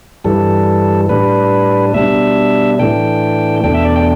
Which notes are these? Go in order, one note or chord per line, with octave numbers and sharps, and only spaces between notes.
G2 E3 G3 A4
A2 G3 D4 B4
B2 G3 D4 E5
A2 E3 A3 D4 G5
E2 B2 A3 D4 G5
E5
D5
G5